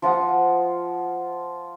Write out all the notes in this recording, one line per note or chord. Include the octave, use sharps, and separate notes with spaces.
F3 F4 F#5 D#6